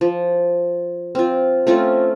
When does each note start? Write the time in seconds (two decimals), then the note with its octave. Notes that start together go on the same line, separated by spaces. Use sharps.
0.01 F3
1.15 C4 F4
1.67 A3 C4 C#4 F4